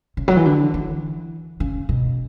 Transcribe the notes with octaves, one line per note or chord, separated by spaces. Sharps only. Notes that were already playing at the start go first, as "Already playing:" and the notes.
C#3
F#3
E3
D3
E3
C#3
B2